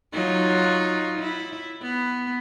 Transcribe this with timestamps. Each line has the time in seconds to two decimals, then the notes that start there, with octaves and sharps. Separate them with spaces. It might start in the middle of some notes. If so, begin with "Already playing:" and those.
0.13 F#3 D#4 F4
1.19 E4
1.81 B3